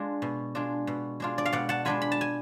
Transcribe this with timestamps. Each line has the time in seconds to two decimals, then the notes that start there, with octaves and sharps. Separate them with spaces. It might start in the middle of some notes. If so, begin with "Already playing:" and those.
Already playing: G#3 D4 F4 F5
0.22 B2
0.55 G#3 D4 F4
0.87 B2
1.20 G#3 D4 F4
1.38 D5
1.46 F5
1.53 B2 D5 F#5
1.69 F#5 A5
1.85 G#3 D4 F4 G#5 B5
2.02 B5
2.12 A5
2.21 G#5